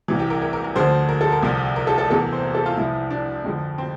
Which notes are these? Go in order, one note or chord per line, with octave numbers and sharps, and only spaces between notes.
C2 C3 E3
G4
A#4
A#4
A#4
A#4
D2 D3 F3 C5
A#4
A4
A#4
C2 C3 F3
A#4
A4
A4
E2 C3 E3 A4
A#4
C5
A#4
A4
F4
C2 C3 F3 E4
D4
F2 D3 F3
C4